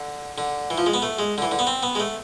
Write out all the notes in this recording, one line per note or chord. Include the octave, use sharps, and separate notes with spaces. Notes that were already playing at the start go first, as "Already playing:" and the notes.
Already playing: D3
D3
E3
F3
G#3
B3
A3
G#3
D3
E3
D3
B3
C4
B3
G#3
A3